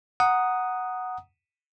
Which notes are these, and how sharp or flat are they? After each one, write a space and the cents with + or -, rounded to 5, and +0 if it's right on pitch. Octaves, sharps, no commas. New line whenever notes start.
F#5 +0 A#5 +5 D#6 +0